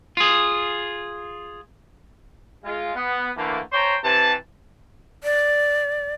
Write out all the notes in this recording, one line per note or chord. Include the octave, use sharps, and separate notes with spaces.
F4 G#4
G#3 F4
B3
D3 E3 A3 A#3
C5 C#5 G5 A5 A#5 C6
C3 E3 A5
D5